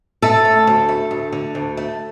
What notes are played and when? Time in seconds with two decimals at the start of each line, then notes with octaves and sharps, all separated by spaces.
0.22 A3 A4
0.45 C#4
0.67 D2
0.89 A3
1.11 D2
1.32 D3
1.55 D2
1.77 A3